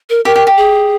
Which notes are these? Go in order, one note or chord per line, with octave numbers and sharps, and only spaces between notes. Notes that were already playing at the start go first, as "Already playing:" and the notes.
A#4
G4 A#4
G4
G4
G#4